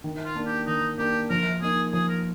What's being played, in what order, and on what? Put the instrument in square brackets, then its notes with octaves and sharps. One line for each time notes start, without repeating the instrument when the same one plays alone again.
[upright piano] D#3
[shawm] F4
[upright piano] A#3 D4
[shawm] G4
[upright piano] D#3 [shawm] D#4
[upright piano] A#3 D4 [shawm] G4
[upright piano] F3 [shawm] A#4
[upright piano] A#3 D#4 [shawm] G#4
[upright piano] F3 [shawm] G#4
[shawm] A#4